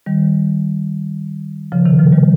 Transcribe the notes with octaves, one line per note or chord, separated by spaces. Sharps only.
D#3 G3
C#3 F3
C3 D#3
C#3 F3
D#3 G3